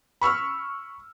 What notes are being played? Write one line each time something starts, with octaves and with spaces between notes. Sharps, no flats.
B5 C#6 E6 F6